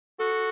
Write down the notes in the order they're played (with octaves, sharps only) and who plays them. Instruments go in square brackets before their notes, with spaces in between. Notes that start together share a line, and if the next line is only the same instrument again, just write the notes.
[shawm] F#4 [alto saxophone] A4